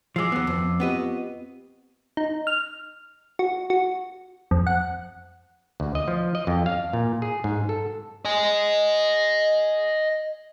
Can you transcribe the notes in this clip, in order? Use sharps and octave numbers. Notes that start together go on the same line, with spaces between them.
F3 G#3 D6 E6 C7
D#2 B3
F2
B3 C4 F4 G4 B4 D#5
D#4
F6
F#4
F#4
F2
F#5
D2
D#5
F3
D#5
F2
F5
A#2
G#4
G#2
A4
D#5 G#5